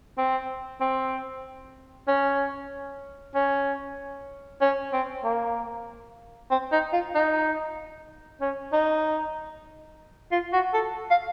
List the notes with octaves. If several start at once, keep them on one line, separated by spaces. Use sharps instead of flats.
C4
C4
C#4
C#4
C#4
C4
A#3
C4
D#4
F4
D#4
C#4
D#4
F4
F#4
A4
F5